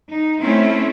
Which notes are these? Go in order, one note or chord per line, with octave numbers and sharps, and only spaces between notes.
D#4
A3 C4 C#4 E4